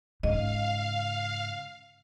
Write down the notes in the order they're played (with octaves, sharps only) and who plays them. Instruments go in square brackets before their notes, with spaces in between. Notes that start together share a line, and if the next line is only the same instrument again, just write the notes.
[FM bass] G#2 [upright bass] C#3 [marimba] D#5 [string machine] F5